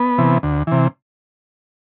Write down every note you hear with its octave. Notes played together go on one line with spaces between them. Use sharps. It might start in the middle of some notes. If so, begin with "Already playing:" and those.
Already playing: B3
C3 E3
D2
C3 E3